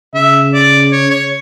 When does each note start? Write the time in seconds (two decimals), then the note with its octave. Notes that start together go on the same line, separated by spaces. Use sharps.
0.14 C#3 E5
0.54 D5
0.92 C#5
1.11 C#5